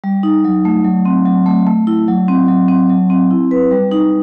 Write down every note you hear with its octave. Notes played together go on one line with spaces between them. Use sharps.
G3
D#4
F#3
A3
F#3
C4
F#3
A3
A3
E4
F#3
C4
F#3
C4
F#3
C4
E4
B4
G3
D#4